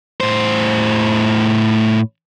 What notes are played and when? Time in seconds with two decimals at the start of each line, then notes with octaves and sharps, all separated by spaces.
0.21 A2 C5